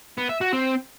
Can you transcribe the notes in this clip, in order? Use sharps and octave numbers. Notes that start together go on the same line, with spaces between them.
B3
E5
F#4
C4